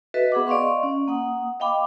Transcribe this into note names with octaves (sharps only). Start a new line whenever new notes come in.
F#4 A4 B4 D#5 E5
B3 G#4 F#5 D6
D5 D#5 F5 C6 C#6
C#4
A#3 F#5 D#6
D#5 F5 G5 B5 D6